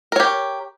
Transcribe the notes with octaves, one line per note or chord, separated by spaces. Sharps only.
G4 A#4 C#5